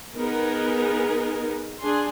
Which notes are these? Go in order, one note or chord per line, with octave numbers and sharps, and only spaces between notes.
B3 D#4 G#4 A#4
D4 G#4 G#5 C6